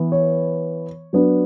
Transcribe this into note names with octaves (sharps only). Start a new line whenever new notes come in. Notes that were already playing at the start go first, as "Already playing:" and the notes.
Already playing: E3 B3
C#5
F#3 B3 D4